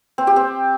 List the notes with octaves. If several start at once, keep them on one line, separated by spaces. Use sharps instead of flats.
C4
G4
C4